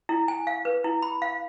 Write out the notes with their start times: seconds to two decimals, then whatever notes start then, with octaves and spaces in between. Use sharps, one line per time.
0.09 E4
0.28 G#5
0.47 F5
0.65 B4
0.84 E4
1.02 B5
1.22 F5